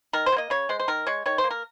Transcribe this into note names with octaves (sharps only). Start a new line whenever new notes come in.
D#3 A#4
C5
F#3
A#3 D#5
C#3 C#5
G#3 C5
C5
D#3 A#4
G#3 C#5
D#3 C#5
C5
A#3
A#4